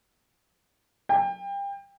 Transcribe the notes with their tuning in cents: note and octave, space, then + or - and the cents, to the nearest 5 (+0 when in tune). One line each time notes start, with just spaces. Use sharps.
G5 +30